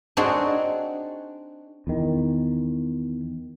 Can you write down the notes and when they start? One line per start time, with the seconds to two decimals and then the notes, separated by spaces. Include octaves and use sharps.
0.17 C4 D4 D#4 F#4 G#4 D5
1.87 E2 D#3